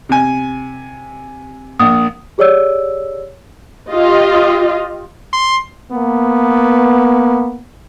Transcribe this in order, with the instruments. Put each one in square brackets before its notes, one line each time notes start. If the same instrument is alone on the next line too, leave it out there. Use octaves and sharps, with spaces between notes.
[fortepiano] C3 G#5
[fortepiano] A#1 [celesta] D#6
[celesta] G4 G#4 C#5 D5 E6
[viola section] F4 G4 D#5
[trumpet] C6
[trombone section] A#3 B3